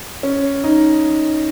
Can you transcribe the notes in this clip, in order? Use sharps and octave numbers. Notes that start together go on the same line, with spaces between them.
C#4
D#4